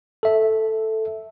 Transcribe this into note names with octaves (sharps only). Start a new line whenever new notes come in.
A4 E5